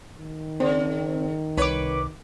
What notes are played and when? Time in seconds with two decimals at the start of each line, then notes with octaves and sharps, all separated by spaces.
0.20 D#3
0.60 C#3 C4
1.57 C2 B4 C#5 D6